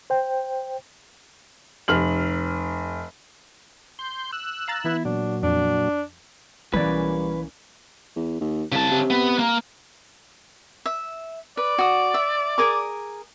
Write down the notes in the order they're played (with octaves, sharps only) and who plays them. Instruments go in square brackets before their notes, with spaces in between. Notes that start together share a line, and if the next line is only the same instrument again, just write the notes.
[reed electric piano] C5 G5
[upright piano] F1 F6 F#7
[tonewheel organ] C6 G6
E6 F#6
[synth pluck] F5 A#5 A6
[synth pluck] E3 B3 [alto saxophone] E4
[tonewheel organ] A#2 F#3 [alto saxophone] D4
[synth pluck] F2 [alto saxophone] D4
[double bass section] B1 A#3 C#4 [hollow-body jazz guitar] E3 D5 [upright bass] G3 [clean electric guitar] B4
[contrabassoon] E2
D#2
[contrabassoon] C2 [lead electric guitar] C#3 A5
[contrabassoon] C3
[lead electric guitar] B3
A#3
[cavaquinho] E5
[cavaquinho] B4 [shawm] D5
[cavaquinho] F#4 D#6
E5
G#4 A#4 D6